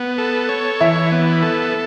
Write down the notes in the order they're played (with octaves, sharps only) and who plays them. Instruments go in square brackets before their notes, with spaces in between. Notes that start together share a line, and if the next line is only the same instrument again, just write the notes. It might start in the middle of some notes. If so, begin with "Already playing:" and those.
Already playing: [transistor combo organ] B3 [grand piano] F#5
[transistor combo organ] A4
C#5
[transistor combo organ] E3 [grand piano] E4 E5
[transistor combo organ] B3
A4